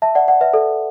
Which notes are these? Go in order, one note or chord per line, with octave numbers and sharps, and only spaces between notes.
E5 A5
D5 F#5
D5 F#5
B4 E5
A4 D5